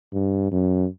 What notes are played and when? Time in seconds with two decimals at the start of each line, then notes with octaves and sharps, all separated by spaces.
0.13 G2
0.52 F#2